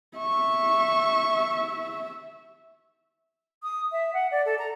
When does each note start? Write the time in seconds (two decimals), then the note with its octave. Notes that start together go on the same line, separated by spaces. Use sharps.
0.18 E5 C#6
3.63 D#6
3.92 E5
4.13 F#5
4.31 D5
4.45 A4
4.59 A#5